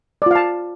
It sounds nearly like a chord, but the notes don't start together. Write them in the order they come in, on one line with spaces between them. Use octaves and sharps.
D5 F4 F5 A5